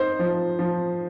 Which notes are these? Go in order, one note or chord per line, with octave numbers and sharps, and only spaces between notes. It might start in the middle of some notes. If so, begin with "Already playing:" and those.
Already playing: D#4 C5
F3
F3